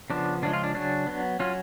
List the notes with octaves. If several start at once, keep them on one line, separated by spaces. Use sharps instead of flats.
C#3 F3 B3 D4
C#3 F3 G#3 D4
F4
D4
C#3 F#3 C#4 D4
F#3 B3
F#3 C#4 F4